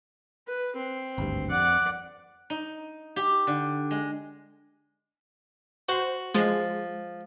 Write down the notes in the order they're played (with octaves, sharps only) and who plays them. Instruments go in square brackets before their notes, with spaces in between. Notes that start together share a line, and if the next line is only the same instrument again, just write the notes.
[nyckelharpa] B4
C4
[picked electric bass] G#1 D2 G2
[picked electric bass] F2 [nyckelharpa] D5 F#5
[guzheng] D#4
G4
D3
G#3
[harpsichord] F#4 [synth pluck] C5
[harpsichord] F3 [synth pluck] G#3